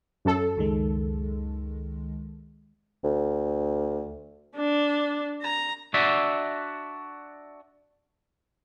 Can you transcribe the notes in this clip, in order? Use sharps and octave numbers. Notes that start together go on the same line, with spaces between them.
F#2 A4
C#2 D#3 G#3
D2
D4
A#5
D4 F#4 D5 E5